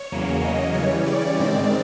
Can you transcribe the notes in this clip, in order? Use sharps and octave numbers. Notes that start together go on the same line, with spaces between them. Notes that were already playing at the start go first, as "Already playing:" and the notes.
Already playing: C#5
E2 C#3 F#3 A#3
D#5
C#3 E3 G3 C#5
D5
G#2 D#3 G#3 C4